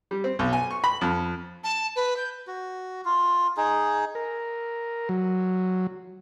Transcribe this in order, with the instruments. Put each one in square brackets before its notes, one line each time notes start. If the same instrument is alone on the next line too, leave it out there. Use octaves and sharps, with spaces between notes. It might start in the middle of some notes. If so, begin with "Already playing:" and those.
[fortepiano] G3
C4
B1
G#5
C#6
B5
F2
[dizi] A5
B4
G6
[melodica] F#4
F4
D#4 G#4
[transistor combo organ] A#4
F#3